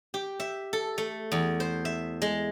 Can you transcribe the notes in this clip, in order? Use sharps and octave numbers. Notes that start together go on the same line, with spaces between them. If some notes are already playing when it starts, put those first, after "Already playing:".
G4
E5
A4
A3
E2
C5
E5
G#3